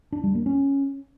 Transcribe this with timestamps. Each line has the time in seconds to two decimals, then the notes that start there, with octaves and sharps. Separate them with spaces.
0.12 D4
0.24 G3
0.35 A#3
0.46 C#4